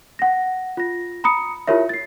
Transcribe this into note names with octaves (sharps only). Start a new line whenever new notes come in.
F#5 A#6
F4 A#6
A#5 B5 D#6 C#7
E4 F4 G4 A#4 C#5 E5
A6 C7